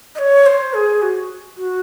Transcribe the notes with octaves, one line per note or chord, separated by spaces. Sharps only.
D#5
C#5
C5
G#4
F#4
F#4